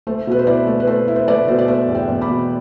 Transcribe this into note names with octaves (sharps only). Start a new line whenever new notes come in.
A3 C5
B2 B4
C5
E4 B4 D5
A3
B4
A3 C5
E4
C5
A3 B4 D5
B2 C5
D5
A3 C5 E5
E2
E5 G5
E2
B5 D6
B2